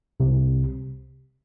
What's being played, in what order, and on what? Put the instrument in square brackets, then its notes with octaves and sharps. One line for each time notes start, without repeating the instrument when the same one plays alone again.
[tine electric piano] C2 C3